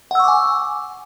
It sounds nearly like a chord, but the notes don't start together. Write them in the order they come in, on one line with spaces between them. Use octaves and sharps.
F#5 E6 C#6 D6 G#5